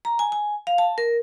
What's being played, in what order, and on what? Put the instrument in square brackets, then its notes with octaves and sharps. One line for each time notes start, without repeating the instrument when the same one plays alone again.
[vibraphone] A#5
G#5
G#5
F5
A5
A#4